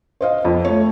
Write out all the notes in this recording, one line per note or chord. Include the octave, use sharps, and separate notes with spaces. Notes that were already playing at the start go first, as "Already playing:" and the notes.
C5 D#5 F5
F2
A3 C#5